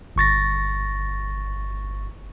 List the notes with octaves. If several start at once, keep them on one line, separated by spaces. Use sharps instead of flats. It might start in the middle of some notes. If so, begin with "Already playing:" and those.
G1 C#6 A6 A#6